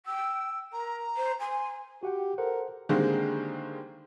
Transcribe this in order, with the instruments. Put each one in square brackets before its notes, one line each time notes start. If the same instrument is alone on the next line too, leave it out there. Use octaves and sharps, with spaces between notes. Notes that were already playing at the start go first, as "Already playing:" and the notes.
[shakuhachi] G5 [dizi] E6
[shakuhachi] A#4 [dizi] A#5
[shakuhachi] C5
[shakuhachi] G#5 [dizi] C6
[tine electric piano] F#4 F#5 G5 [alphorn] G4
[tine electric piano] A4 C5 F#5 [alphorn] A#4
[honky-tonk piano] D3 D#3 G3 G#3 A#3 C4